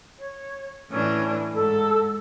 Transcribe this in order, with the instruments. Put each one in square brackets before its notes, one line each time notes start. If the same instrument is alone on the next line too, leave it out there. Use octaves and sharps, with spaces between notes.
[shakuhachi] C#5
[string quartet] A2 E3 D4 [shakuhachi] C#4
[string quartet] G#2 [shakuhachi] A4